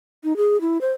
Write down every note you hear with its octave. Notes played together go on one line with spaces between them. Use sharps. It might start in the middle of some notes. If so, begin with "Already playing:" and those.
D#4
G#4
E4
C5